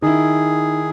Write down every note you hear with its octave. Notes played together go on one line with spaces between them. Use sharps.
D#3 D#4 E4 G#4